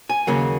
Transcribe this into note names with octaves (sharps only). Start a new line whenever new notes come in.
G#5
D#2 C#3 F#3 A#3